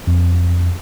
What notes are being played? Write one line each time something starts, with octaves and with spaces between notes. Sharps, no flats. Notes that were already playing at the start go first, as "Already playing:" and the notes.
F2